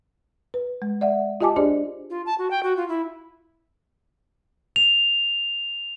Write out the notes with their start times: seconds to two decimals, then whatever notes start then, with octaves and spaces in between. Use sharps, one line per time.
0.54 B4
0.82 G#3
1.01 D5 E5 F#5
1.41 F4 G4 D#5 G#5 A5 D6
1.56 D4 G4 G#4 C5 D5 D#5
2.10 F4
2.26 A5
2.38 F#4
2.51 G5
2.63 F#4
2.77 F4
2.89 E4
4.76 F7